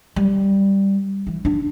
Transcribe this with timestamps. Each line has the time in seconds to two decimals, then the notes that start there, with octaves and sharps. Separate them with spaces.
0.16 G3
1.27 E3
1.45 D4